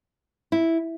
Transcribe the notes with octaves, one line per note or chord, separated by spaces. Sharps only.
E4